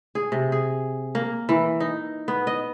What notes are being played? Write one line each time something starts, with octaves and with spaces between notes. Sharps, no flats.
G#4
C3
G#4
A#3
E3
D#4
B3
D#5